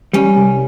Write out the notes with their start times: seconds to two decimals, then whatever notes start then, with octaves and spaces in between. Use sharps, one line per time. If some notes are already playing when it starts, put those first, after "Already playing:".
0.13 G3 C#4
0.36 C2